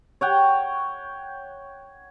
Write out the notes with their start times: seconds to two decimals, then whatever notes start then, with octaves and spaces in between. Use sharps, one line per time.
0.21 C#5 F#5 G5